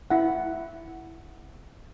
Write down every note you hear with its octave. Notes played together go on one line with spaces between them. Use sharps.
E4 F#5